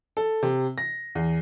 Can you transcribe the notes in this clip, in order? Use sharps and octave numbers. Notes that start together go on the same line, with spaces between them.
A4
C3
A#6
E2